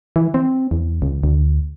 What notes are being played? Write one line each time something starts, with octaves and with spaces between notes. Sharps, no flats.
E3
C4
E2
C#2
D2